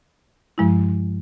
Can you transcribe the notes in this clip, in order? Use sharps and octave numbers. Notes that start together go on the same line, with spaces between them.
G2 F3 G#3 E4